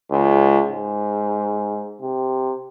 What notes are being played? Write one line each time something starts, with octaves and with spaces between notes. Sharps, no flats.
C#2
G#2
C3